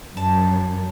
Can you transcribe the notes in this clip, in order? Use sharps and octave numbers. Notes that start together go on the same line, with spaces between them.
F#2 A5